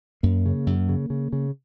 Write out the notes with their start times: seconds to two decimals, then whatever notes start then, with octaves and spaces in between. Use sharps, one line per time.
0.23 F#2 A#3
0.46 C#3
0.67 F#2
0.89 C#3
1.10 C#3
1.33 C#3